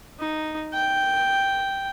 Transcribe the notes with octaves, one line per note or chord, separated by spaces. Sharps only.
D#4
G5